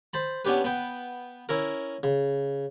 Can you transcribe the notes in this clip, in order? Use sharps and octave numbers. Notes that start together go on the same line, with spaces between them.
C5 A5 B5
B3 C#4 D4 G4 B4
B3 B4 G5
C#4 E4 A#4
C#3